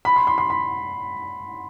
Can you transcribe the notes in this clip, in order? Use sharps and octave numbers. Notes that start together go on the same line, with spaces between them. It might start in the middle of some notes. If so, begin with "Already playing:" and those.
B5
C6
C6
C6
B5